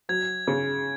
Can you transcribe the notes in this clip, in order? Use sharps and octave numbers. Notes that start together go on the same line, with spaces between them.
F#3 G#6
C#3